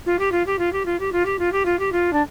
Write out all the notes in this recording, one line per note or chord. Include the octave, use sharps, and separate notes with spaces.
F4
G4
F4
G4
F4
G4
F4
G4
F4
G4
F4
G4
F4
G4
F4
D4